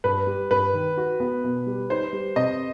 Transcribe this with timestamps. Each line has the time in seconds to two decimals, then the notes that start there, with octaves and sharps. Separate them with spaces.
0.04 G2 B4
0.27 G3
0.50 G2 B4
0.74 D#3
0.97 F#4
1.20 B3
1.44 B2
1.67 G3
1.90 D#4 C5
2.13 G3
2.36 C3 D#5